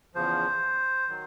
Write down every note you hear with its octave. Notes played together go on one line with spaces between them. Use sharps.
E2 C#3 F3 C5
D#3 F#3